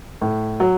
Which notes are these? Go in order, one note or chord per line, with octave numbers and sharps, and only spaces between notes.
A2
F#3